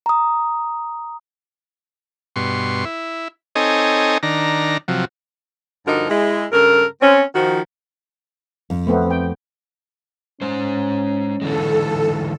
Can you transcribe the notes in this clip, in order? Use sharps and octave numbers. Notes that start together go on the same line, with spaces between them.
A#5 D#6
G2 B2 C6 C#6
E4
C4 D#4 A4 C#5 D#5 G#5
D#3 D4 A#5
C3 F3 F#3
G2 D3 F3 D#4 F#4 A#4
G#3 E4
G2 C#3 A4 A#4
C4 C#4
D#3 F3 F#4
F2
A3 B3 C4
G5
G#3 C#4 C5
D3 E3 G#3 A4